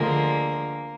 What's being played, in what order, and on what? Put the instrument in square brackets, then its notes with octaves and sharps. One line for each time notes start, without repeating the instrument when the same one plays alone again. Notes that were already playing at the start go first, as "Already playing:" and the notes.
Already playing: [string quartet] D2 D3 F3 G#3 A#3